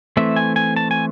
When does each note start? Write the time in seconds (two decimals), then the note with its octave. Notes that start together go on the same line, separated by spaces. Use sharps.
0.17 E3 A3 C4 E5
0.36 G#5
0.56 G#5
0.76 A5
0.91 G#5